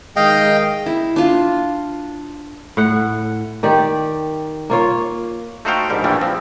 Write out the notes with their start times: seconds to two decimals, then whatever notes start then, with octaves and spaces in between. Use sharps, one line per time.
0.16 D#3 G#3 D#5 F5 G5
0.86 E4
1.16 D4 F4
2.77 A2 F#5
3.63 D#3 G4 D5
4.70 A#3 F4 C#5
5.65 A3 D#4 F#4 C5 F5 G5
5.90 A#1 G#2 G3 A#4
6.04 A#1 E3 G3 A3
6.21 F3 C4